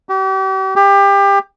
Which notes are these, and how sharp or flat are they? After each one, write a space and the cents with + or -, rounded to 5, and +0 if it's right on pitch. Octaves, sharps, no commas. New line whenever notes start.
G4 -40
G4 +25